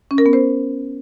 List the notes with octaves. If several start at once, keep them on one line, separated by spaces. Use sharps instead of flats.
C#4
A#4
B3
C5